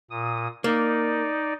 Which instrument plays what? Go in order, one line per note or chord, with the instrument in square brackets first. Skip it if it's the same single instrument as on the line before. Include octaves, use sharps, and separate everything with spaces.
[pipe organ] A#2 D#6
[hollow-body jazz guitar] A#3 [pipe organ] D#4 D5